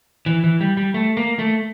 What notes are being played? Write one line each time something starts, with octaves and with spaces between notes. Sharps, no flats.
E3
E3
G3
G3
A3
A#3
A3